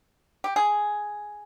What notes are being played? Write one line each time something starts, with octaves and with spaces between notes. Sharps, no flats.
G4
G#4